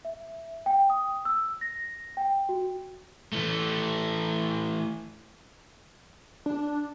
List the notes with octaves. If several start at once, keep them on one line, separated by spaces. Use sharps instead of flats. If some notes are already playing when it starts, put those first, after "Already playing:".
E5
G5
D#6
E6
A#6
G5
F#4
E3 A3
D4